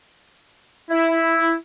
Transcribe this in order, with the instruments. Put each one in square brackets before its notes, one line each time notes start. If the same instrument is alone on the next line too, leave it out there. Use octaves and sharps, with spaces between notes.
[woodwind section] E4